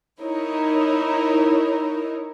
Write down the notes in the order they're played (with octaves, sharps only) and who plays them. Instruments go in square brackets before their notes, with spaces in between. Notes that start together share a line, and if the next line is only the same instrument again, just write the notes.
[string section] D#4 E4 A#4 C#5